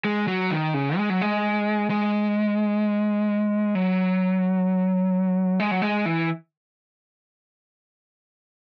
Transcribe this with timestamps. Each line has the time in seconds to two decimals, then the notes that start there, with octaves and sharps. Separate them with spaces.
0.05 G#3
0.28 F#3
0.51 D#3
0.74 C#3
0.97 G#3
1.10 F#3
1.21 G#3
1.90 G#3
3.75 F#3
5.60 G#3
5.71 F#3
5.82 G#3
6.06 E3